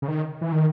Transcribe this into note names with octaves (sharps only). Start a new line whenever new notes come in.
C#3
D#3
E3
D#3